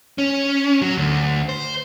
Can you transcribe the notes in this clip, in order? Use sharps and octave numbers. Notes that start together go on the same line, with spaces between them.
C#4
F#3
D2
C5